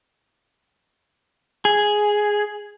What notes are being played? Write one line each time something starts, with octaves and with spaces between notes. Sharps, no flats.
G#4